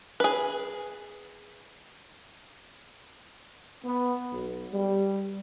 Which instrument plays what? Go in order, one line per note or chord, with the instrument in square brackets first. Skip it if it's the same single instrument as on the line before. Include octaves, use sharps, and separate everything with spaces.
[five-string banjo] G#4 B4
[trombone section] B3
B1
G3